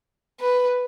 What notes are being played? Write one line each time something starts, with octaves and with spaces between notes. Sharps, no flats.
B4